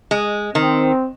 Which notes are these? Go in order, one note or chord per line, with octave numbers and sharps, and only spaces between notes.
G#3
D#3 C4